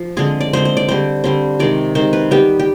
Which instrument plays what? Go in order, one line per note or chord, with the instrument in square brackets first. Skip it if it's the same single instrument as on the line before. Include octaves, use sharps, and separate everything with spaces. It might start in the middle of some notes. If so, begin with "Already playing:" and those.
Already playing: [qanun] F3
D3 G#3 C4 G#4
D5
D3 G#3 C4 C5
C5
D5
D3 G3 C4 C5
D3 G3 C4 C5
C3 D#3 G#3 D5
C3 D#3 G#3 C5
B4
D#3 G3 B3 G4
G4